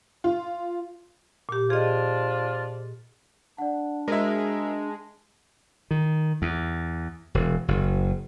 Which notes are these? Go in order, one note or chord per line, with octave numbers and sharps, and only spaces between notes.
F4
A#2 G4
F3 D4 F4 G#4 D#5
D4 D5 F#5
G#3 F#4 A#4 C5 D#5 E5
D#3
E2
E1
F#1